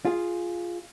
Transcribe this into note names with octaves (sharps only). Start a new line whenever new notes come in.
F4 G#4